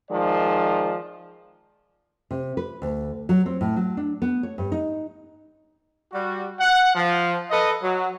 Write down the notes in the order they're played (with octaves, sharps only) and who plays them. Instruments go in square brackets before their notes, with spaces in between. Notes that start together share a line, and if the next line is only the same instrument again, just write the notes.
[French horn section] D#3 F3 G#3 D5
[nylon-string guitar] C3
B4
D2
F#3
C4
A2
F#3
D4
B3
C#5
G2
D#4
[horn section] G3 F#4
F#5
F3
A4 B4 D#5
F#3